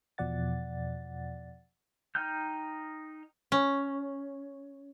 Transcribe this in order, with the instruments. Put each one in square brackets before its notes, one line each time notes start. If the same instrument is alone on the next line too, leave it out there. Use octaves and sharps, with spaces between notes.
[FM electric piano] E2 B2 F3 D5 F#5 A6
[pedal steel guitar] D#4 G5 F6 G6
[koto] C#4